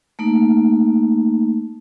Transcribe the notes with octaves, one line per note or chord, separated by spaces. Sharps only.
A3 A#3 D#4